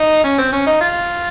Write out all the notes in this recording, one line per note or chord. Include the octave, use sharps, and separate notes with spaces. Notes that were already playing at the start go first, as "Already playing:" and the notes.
Already playing: D#4
C#4
C4
C#4
D#4
F4